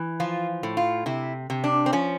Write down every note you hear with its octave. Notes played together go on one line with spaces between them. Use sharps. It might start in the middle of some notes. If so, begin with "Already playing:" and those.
Already playing: E3
F3 F4
A2
F4
C3 E4
C3
D4
C4
F3 C#4